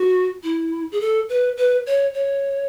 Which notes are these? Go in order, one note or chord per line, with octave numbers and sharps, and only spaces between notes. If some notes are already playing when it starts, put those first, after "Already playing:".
Already playing: F#4
E4
G#4
A4
B4
B4
C#5
C#5